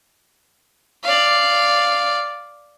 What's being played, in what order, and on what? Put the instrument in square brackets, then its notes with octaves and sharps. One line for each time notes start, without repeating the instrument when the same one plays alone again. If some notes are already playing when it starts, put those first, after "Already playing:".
[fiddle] D5 F5